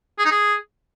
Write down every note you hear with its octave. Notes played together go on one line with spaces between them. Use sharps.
G#4
D#4
G#4